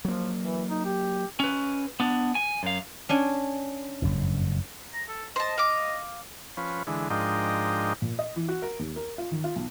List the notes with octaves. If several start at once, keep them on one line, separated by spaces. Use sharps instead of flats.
F3 F#3 A#3
E3
D#4
G4
C#4 B4
B3 D4
G#5
F#2 F5
C#4 D4 G#5
F#1 F2 G#2
A#5
A4
C5 D#5 A5
F5 D6
F3 C#4 B4
D3 E3 G#3
G#2 F3 D4 A#4 D#5 G5
A#2
D#5
E3
F#4
A#4
D#2
A#4
F4
D#3
F4
B1